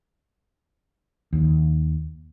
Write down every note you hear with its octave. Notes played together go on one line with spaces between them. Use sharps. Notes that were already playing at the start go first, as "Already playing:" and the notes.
D#2